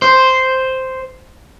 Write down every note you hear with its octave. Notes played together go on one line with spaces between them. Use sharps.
C5